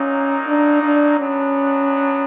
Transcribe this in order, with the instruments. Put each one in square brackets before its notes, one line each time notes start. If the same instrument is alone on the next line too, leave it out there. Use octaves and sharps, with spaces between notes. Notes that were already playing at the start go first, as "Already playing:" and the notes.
Already playing: [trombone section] A#2 F#3 A#3 D#4 [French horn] C#4
[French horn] D4
D4
[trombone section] F#3 B3 D4 [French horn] C#4